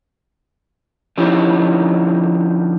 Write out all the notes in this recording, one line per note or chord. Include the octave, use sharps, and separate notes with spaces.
D3 F3 C#4 D#4 E4 G4